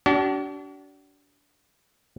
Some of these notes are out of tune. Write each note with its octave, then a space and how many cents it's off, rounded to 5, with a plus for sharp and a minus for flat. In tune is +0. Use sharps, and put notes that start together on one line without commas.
D4 -30 F#4 +45